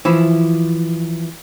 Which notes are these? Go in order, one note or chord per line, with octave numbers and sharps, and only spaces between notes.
E3 F3 E4